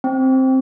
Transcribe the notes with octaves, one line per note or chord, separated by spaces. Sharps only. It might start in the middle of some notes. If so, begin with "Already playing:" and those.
C4